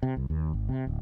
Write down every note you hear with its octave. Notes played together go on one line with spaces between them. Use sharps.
C3
C2
D#2
G#1
C3
D1